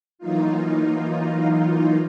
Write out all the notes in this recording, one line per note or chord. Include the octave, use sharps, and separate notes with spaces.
E3 F#3 A#3 D#4 F4